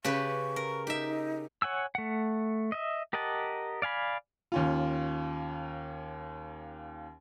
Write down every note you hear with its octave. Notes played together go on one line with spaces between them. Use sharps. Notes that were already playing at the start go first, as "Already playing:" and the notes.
C#3 G4 B4 C#6
A#4
D#4 G4 E5
C#5 F#5 G#5 E6
A3 F#5
D#5 E5
G4 A#4 D#5 F#5 A5
D5 F5 G#5 B5
D#2 C#4 F4